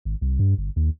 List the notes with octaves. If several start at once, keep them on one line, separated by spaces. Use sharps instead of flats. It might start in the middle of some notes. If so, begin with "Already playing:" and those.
G#1
C2
G2
G1
D#2